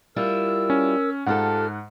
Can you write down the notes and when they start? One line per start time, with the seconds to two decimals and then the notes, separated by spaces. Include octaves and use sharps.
0.16 G3 E4 F4 A#4 E6
0.70 C#4
1.27 G#2 F4 G4 A4 F#5 F6